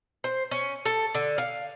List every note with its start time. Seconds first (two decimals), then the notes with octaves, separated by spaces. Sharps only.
0.24 C5
0.51 C#4
0.85 A4
1.15 D3
1.38 F5